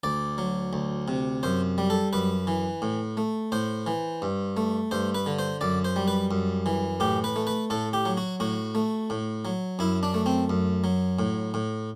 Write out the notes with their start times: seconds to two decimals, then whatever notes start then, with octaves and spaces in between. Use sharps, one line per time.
0.04 D2 D5
0.38 F#3
0.73 D2
1.08 C3
1.43 F#2 C5
1.78 G3
1.90 A4
2.13 F#2 B4
2.47 E3
2.82 A2
3.17 A3
3.52 A2 C5
3.87 E3
4.22 G2
4.57 A3
4.91 G2 C5
5.15 B4
5.26 D3
5.39 C5
5.61 F#2 D5
5.85 C5
5.96 G3
6.08 B4
6.31 F#2
6.66 E3
7.00 A2 G4
7.24 B4
7.36 A3
7.47 B4
7.70 A2 A4
7.93 G4
8.05 F#3
8.17 F#4
8.40 A2 F#4
8.75 A3
9.10 A2
9.45 F#3
9.79 F#2 E4
10.03 D4
10.14 A3
10.26 C4
10.50 F#2
10.84 F#3
11.19 A2
11.54 A2